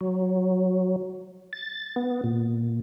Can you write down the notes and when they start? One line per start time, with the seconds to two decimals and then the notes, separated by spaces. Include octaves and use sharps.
0.01 F#3
1.53 A6
1.96 B3
2.24 A#2